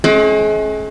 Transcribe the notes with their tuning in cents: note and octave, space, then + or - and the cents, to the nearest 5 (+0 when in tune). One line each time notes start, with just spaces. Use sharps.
G#3 +40 C#4 -35